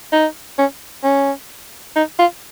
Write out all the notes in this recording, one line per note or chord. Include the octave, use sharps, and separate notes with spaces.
D#4
C#4
C#4
D#4
F4